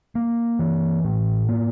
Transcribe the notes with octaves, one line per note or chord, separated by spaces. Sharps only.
A#3
E3
A2
A#3